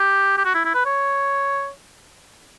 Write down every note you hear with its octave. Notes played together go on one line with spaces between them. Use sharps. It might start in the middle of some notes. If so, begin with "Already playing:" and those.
Already playing: G4
G4
F#4
E4
E4
B4
C#5